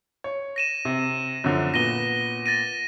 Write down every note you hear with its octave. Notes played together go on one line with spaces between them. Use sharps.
C#5
A#6 D#7 E7
C3
F#2 D3 F3
A#2 B3 A#6 D#7 G7
A6 A#6 D#7